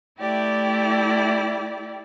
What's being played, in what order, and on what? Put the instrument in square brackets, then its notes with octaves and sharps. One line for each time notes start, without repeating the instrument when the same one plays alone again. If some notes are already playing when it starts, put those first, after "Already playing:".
[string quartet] A3 E4 G4 D5